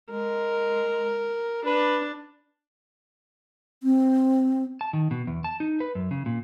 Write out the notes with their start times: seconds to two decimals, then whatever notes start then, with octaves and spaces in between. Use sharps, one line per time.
0.11 G#3 A#4
1.66 D4 B4
3.83 C4
4.81 A5
4.93 D#3
5.11 B2
5.27 E2
5.44 A5
5.60 D#4
5.80 B4
5.95 F#2
6.11 C#3
6.26 A#2